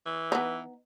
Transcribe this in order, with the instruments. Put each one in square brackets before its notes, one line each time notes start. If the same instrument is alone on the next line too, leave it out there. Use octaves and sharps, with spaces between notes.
[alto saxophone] E3
[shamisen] B3 D#4